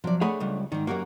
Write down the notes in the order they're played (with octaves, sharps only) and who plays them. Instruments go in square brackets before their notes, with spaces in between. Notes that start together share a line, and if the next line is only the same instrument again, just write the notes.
[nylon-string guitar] C3 D5 [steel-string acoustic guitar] F3 F#3
[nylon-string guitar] A3 D4 F#5 [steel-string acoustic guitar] C4 [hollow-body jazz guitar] G#4 C#5 B5
[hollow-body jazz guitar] C#2 G3
[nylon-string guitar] G#2 D5 [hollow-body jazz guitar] D#3 [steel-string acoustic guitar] G3
[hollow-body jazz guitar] F#2 B2 A#3 [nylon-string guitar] F#4 G4 A#4 [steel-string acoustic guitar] A#5